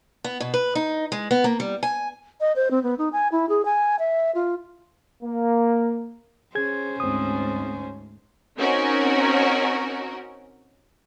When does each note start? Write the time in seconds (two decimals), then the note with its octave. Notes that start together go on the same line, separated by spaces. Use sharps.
0.24 B3
0.40 B2
0.54 B4
0.75 D#4
1.12 G#3
1.31 B3
1.44 A#3
1.60 G3
1.83 G#5
2.41 D#5
2.56 C5
2.71 C4
2.83 B3
2.98 D#4
3.13 G#5
3.32 E4
3.49 G#4
3.65 G#5
3.99 E5
4.35 F4
5.23 A#3
6.55 C#4 G#4 C5 G#6
7.00 D2 G#2 C4 D#6
8.59 C4 C#4 D#4 F#4 A#4